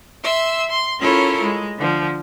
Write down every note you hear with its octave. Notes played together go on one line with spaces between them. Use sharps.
E5 C6 E6
C6
C#4 E4 F4 A4 A#4 C#5
G#3
D3 F3